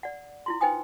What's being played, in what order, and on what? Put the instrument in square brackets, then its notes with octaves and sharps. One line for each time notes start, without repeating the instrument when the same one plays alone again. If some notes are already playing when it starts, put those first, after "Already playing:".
[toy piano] D5 F#5
E4 F4 C6
D#4 B4 C5 G5 G#5 D#6